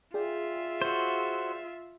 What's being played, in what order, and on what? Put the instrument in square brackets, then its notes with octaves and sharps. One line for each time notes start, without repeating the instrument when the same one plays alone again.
[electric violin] F4 E5 [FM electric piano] G#4 D5 G5
[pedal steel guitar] F#4 C5